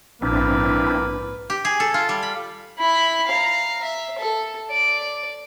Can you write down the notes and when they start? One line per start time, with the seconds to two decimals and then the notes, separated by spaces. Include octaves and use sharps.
0.22 A#1 G#2 A#3 C4 D4 E4 B4
1.50 G4
1.65 G#4
1.80 A4
1.94 F4
2.09 G3
2.23 B5
2.79 E4 B5
3.27 F5 A#5
3.83 E5
4.19 A4
4.71 D5